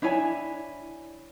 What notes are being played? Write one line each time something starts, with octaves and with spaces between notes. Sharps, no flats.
D4 E4 C#5 G#5